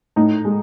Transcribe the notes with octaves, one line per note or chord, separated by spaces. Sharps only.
A2 D#4
G#3